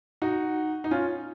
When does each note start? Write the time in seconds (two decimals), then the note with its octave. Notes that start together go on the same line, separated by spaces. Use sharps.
0.22 D#4 F#4
0.84 D#4
0.91 C#4 F4